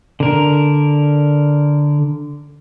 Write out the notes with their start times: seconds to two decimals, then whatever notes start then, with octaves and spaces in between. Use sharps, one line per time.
0.20 D3 A#4